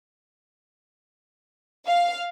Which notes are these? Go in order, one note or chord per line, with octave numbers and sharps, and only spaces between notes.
F5